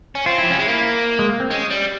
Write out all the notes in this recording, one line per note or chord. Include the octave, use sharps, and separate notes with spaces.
C#4
C4 F4
F3 E4
G3 C#4
G#3 E4
A#3
G#3
A#3
C4
G#3 C#4
G3